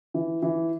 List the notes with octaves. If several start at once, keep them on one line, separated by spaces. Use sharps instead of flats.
E3
E3